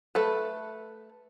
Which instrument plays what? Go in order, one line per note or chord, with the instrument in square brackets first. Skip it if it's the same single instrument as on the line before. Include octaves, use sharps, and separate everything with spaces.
[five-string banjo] A3 A4 B4